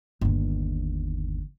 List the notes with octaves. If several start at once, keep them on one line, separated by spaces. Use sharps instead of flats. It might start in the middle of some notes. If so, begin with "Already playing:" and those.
G1 D#2